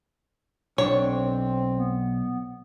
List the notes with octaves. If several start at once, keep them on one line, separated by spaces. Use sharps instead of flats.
B1 C4 D4 C#5
B3